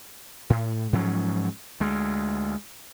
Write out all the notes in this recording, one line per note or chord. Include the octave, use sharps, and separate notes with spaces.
A2
G#2 F3 F#3 C#4
D2 G#3